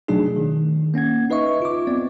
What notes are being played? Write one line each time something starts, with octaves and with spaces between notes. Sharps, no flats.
B2 F#3 A3 D4 D#4 G#4
D#3
A#3 C#4 F#5 G#6
D#4 B4 D#5 E5 C#6
F4 D6
B3 C4 D5